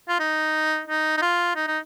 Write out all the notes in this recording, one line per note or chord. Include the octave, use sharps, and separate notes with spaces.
F4
D#4
D#4
D#4
F4
D#4
D#4